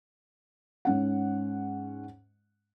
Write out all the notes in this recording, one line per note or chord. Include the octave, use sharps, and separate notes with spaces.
G#2 C#4 F#5